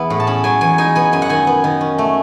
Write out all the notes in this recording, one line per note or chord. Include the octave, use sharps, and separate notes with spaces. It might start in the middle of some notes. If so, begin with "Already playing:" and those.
Already playing: E2 B3 E4 F#5 B5
A2
A5
C#4 B5
F#3 G#5
E2 G#5
D#4 G#5
B3 G#5
F#2 G#5
F#5
D#3 G#5
B3
D#3
C#4
A3